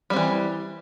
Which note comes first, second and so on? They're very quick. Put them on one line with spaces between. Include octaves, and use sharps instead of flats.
G3 C4 E3